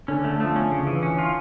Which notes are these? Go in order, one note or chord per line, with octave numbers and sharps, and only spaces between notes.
D3 C#4
A3
F3 A3
C#4
C#3
E3
C#4
F4